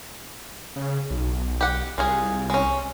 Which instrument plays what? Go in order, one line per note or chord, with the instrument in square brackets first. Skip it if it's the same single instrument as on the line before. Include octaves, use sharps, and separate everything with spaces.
[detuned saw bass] C#3
B1
[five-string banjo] G4 F#5
[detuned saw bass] C2 [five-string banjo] G#3 F4 G#4
[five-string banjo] G#3 C#4